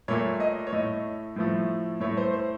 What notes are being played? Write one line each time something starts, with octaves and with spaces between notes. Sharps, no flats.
A#2 A3 C#5
D#5
C#5
A2 A3 D#5
A2 F3 A3
A2 A3 C#5
C5
C5